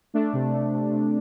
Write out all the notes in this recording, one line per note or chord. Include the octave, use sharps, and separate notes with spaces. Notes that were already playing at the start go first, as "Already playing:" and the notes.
A3 D4
C3
A3
C3
C3